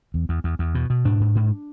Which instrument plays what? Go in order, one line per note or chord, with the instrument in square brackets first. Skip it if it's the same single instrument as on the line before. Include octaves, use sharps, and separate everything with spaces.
[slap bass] E2
E2
E2
E2
B2
B2
G#2 D4
G#2
G#2